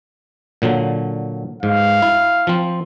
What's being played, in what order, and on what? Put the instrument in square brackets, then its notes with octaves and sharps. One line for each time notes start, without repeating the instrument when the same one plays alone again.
[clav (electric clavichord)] A#2 D3 F#3
[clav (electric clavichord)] G#2 [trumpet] F5
[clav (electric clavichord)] E4
F3 C4